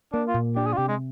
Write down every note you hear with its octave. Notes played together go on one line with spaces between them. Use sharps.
A#3 D4
F4
A#2
D4 G4
G#4
F4
C3 G4
G#3